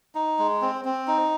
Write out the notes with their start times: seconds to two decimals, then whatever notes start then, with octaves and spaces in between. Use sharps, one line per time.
0.15 D#4
0.39 G#3
0.62 C4
0.85 C4
1.07 D#4